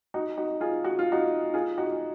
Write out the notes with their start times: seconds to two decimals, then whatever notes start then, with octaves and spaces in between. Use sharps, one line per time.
0.14 D#4 F#4
0.37 D#4 F#4
0.61 F4 G#4
0.84 F#4
0.99 F4
1.12 D#4 F#4
1.54 F4 G#4
1.78 D#4 F#4